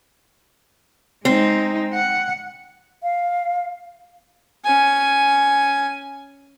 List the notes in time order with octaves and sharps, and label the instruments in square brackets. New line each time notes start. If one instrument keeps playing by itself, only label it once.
[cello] G#3 D#4 [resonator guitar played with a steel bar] C4
[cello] F#5
[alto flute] F5
[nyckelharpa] C#4 G#5